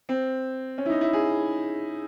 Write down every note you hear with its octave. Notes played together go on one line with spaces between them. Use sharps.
C4
C#4
E4
D#4
E4
G#4